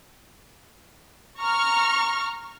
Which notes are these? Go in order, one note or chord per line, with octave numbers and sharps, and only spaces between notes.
A#5 C#6 F6